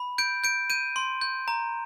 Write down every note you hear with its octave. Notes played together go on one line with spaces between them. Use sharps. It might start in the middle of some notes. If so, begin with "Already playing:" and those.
Already playing: B5
G6 D7
G6 D7
G6 D#7
C6
G6
A#5